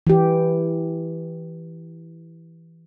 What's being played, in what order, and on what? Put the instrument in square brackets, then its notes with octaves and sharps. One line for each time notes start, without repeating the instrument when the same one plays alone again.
[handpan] E3 G4